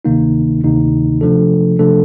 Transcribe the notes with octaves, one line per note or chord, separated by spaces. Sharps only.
D2 C3 D#3 A#3 D#4
D2 C3 D#3 A#3 D#4
C3 F3 A3 D4 A4
C3 F3 A3 D4 A4